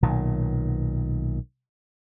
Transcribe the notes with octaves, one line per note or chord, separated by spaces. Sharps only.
B1 A#2 D#3